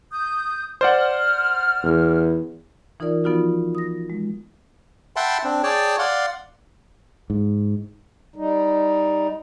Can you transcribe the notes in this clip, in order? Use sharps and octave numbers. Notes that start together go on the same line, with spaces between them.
D#6 G6
C5 D5 F#5 F6
E2
E3 D#4 F4 A#4 D5
F3 B3 D#4 F4 F#4
D#6 A#6
G#3
E5 F#5 G5 A5 B5 C6
C4 D4
G#4 C#5 D5 G5 A5
D5 F5 F#5 C6
G#2
G3 D#4